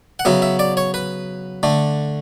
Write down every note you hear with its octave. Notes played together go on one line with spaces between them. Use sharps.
F#5
C#3 F#3 B3 E5
E5
D5
C#5
B4
D3 A3